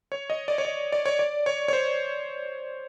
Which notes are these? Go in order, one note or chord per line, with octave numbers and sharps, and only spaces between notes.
C#5
D#5
D5
C#5
D5
D5
C#5
D5
C#5
C#5
C5